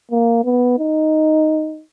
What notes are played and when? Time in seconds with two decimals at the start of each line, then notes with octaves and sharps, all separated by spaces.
0.11 A#3
0.44 B3
0.79 D#4